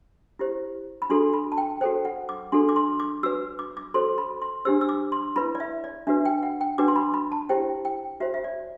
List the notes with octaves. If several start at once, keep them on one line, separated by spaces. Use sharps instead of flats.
E4 G4 C5
B5
D4 F#4 A4 C6
B5
A5
G5
F#4 A4 C5 G5
F#5
D6
D4 F#4 A4 C6
D6
C6
D6
F#4 B4 E6
D6
D6
F#4 A4 C5 C6
B5
C6
D4 G4 C5 E6
E6
D6
C6
E4 B4 B5
D5
E5
D5
D4 F#4 B4 E5
G5
F#5
G5
D4 F#4 B4 D6
C6
B5
B5
A5
E4 G4 C5 G5
G5
F#4 C5 E5
E5
D5